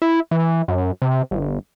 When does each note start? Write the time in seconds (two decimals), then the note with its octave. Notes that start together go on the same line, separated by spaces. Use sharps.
0.02 E4
0.31 E3
0.68 F#2
1.02 C3
1.31 G1